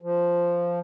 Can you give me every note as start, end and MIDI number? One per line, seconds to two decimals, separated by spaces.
0.02 0.79 53